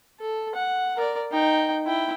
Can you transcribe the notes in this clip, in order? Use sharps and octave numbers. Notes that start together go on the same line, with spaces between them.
A4
F#5
A#4 D5
D#4 G5
E4 G5